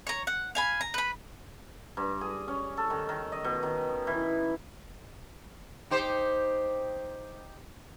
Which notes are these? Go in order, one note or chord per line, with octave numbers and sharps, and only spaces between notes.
C#5 A#5
F#5
F5 G#5 B5
A#5
B4 B5
G2
G#4
C#4
A4
D#3
D#3
D#5
B2
D#3
E3
D#4 G4 C5